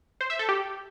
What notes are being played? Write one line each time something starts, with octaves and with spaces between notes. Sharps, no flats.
C5
E5
A4
G4